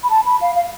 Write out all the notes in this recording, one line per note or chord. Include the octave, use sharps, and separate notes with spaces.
B5
A5
B5
F5
F5